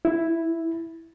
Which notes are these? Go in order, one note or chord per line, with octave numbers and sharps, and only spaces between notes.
E4